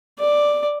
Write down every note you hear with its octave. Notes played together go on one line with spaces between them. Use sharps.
D5